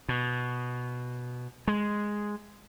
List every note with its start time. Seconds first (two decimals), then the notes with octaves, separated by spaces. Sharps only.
0.09 B2
1.67 G#3